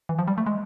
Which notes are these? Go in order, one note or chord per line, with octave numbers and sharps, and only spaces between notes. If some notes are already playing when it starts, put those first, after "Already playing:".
E3
F3
G3
A3
G#3